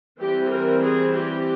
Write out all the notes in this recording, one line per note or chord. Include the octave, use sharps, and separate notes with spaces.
E3 G3 C4 G4
A#4
G#4
G4